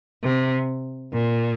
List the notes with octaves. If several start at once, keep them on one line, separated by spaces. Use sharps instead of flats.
C3
A#2